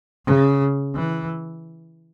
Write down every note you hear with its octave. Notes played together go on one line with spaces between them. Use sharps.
C#3
E3